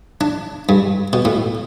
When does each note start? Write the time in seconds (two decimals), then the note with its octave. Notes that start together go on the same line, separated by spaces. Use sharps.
0.21 D4
0.69 G2
1.13 B2
1.25 A2